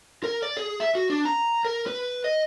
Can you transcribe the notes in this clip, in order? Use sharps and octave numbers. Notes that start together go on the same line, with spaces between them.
A#4
D5
G#4
E5
F#4
D4
A#5
A#4
B4
D#5